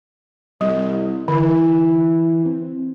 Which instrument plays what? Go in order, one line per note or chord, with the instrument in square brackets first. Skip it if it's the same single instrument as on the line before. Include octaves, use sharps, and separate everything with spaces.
[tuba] C2 [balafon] G3
[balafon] D3 [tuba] E3
[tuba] C4